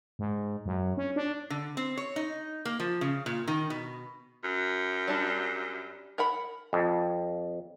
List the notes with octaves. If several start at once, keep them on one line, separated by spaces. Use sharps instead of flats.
G#2
F#2
C#4
D4
D3
C4
C#5
D#4
A#3
F3
C#3
A#2
D#3
B2
F#2
G3 D4
A#4 F#5 B5
F2